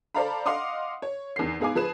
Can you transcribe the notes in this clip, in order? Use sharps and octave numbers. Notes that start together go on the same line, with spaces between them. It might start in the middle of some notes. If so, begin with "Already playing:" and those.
A4 C5 D5 F5 A#5 B5
D#5 F5 F#5 C6 D6 D#6
C#5
E2 D#3 C7
G#2 B3 G#4 F5 G#5 D6
F3 G#4 B4 E7